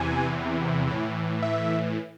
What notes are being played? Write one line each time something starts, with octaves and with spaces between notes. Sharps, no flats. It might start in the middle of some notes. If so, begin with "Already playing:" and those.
Already playing: E2 C3 E3 G#5
A2 E3
E5